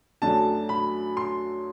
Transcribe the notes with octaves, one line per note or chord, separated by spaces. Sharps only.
F#2 F#3 A3 D4 A5
B5
C6